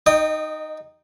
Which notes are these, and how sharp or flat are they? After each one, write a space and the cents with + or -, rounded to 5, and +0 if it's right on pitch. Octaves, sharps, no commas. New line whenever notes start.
D#4 +0 D#5 -35 G5 +0